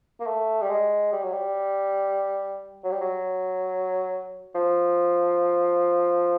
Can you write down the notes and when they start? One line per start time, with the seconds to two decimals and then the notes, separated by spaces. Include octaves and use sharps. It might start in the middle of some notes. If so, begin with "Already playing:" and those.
0.20 A#3
0.27 A3
0.61 G3
0.69 G#3
1.13 G3
1.23 F#3
1.32 G3
2.84 F#3
2.91 G3
3.01 F#3
4.55 F3